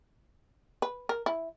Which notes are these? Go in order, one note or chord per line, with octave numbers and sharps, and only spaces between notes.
B4
A#4
E4